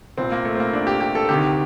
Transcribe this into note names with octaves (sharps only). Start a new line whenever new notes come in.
C2 A#2 C4
A#3
A3
C4
A#3
D4
G4
G4
A4
D2 C3 D#3 G4